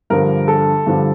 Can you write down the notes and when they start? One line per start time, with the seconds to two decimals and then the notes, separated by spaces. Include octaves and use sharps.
0.10 G2 D3 F3 A#4
0.48 A4
0.86 G2 D3 F3